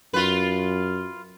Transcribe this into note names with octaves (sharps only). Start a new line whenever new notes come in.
F#2 F4 B4